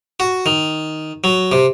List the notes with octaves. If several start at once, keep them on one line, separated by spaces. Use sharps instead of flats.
F#4
D#3
F#3
C3